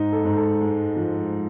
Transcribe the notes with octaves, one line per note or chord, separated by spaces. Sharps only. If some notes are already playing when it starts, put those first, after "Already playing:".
Already playing: G#2 D#4
A4
G#2
A4
G#3
F3